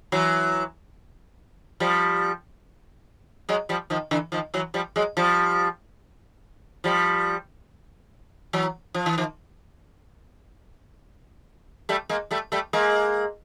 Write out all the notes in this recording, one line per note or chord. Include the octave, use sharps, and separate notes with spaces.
E3 F#3
F3 G3
F#3 G#3
F3 G3
D#3 F3
D3 E3
D#3 F3
E3 F#3
F3 G3
F#3 G#3
F3 G3
F3 G3
E3 F#3
F3
E3
D#3 F3
G3 A3
G#3 A#3
G3 A3
G3 A3
G#3 A#3